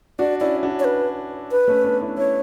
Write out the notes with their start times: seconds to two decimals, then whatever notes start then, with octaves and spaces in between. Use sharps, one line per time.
0.19 D4 F#4 D5
0.41 C#4 E4 D5
0.63 D4 F#4
0.80 C#5
0.85 B4
1.52 B4
1.68 A3 C#4
1.84 B3 D4
2.01 C#4 E4
2.17 C#4 E4 C#5